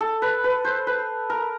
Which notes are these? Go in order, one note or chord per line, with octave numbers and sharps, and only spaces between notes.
A4
B4
B4
C5
B4
A#4